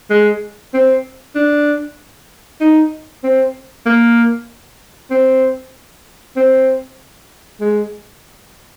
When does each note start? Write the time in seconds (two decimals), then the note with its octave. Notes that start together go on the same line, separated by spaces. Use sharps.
0.10 G#3
0.74 C4
1.35 D4
2.61 D#4
3.24 C4
3.86 A#3
5.11 C4
6.36 C4
7.61 G#3